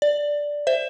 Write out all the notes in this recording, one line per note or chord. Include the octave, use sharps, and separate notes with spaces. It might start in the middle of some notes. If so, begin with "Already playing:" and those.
D5
C5 E5